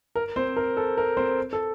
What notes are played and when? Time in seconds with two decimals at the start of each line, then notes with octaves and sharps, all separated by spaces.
0.15 A#4
0.36 C4 C5
0.56 A#4
0.77 A4
0.97 A#4
1.17 C4 C5
1.53 A4